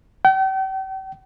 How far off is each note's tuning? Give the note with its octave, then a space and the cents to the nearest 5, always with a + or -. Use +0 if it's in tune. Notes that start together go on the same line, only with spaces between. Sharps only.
G5 -40